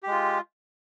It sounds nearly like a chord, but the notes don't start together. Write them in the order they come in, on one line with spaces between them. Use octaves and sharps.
G4 G#3 F4